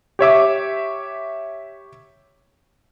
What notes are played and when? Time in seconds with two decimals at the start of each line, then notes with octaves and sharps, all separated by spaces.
0.19 G4 C#5 E5 D6